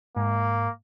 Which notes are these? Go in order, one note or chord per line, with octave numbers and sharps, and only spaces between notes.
G#2 A#3